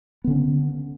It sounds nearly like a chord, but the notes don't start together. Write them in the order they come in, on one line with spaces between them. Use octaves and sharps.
B3 D3 C#4